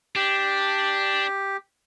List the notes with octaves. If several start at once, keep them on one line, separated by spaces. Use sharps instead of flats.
D4 G4